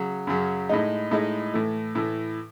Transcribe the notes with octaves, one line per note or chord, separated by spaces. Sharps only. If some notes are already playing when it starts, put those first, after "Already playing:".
Already playing: C#3 F#3
F#2 C#3 F#3
A2 G#3 D#4
A2 G#3 D#4
A2 E3 A3
A2 E3 A3